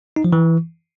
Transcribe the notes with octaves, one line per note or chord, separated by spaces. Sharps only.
D#4
F3
E3